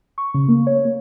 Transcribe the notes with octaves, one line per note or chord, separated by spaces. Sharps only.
C#6
C#3
A#3
C#5
A#3